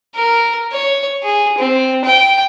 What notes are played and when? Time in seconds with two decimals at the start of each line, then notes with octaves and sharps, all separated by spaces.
0.16 A#4
0.72 C#5
1.23 G#4
1.59 C4
2.05 G5